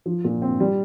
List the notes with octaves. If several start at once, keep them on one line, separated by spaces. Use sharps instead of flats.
F3
A#2
C4
G3